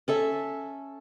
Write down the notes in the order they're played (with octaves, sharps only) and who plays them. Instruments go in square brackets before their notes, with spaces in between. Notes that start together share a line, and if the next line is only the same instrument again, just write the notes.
[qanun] C#4 A4 E5